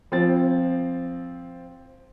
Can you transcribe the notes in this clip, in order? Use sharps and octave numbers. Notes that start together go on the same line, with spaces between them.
F3 C4 A6